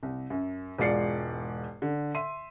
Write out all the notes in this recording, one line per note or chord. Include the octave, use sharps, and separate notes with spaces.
C2
F#2
E1 G#2 F4 D5 C7 C#7
D3
E5 C6 D#7